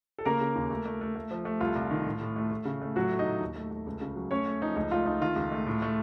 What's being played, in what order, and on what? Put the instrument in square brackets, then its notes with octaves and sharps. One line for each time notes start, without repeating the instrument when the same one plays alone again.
[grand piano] A4
C#3 A#3 A#4
C#3
D#2
A3
A3
A3
A3
F3
A3
C2 F4
C2
D#3
A2
A2
A3
A3
C#3
A3
A2 F#3 F#4
A3
D#4 D#5
A2
D#2
A3
A3
C#2
C#3
F#3
A3 C#4 C#5
A3
F3 D#4
C#2 D#4
A3 F4
A3 D#4
D#3 F4
C#2
A3
A2
A3